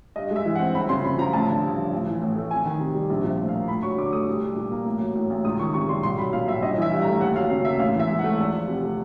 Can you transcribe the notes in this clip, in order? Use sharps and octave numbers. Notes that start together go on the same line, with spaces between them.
G2 D#5
G#3
E5
E3
F#5
C4
G1 B5
C#3 C6
F2 B5
F3 A#5
A1 A5
D3
G2
F3
A1
E3
A2
A3
F2 G#5
D#3
C3
G3
A#1
F3
E5
A2
F5
A#3
D2 B5
F#3 C#6
D3 D6
A3 D#6
C2
G3
A#2
A#3
A1
F#3
A2
A1
C#2 D#6
D#3 C#6
C3 C#6
G3 C6
B1 C6
F#3 B5
A#2 F5
B1 E5
G1 D#5
E3 E5
G2
A#5
A3
D#2 F#5
F#3 F5
C#3 F5
A#3 E5
A1 F5
E3
E5
G#2
F#5
A3
E2
F3
C3
A3